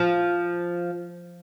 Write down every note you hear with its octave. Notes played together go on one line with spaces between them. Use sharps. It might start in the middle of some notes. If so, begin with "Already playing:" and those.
Already playing: F3